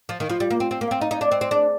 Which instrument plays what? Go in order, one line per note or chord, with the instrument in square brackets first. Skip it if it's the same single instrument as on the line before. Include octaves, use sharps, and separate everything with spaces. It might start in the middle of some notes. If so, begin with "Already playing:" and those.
[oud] F3
D#3
[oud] F3 [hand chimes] F4
[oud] G3
A#3
C4
C4
A#3
[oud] C4 [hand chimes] F5
[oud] D#4 [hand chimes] D#5
[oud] D#4 [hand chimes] D5
[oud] D4
[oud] C4 [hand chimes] C5
[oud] C4
[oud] D4 [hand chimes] G#4